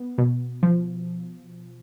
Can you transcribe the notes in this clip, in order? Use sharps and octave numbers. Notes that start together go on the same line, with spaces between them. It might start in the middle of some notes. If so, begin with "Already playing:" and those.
Already playing: B3
B2
F3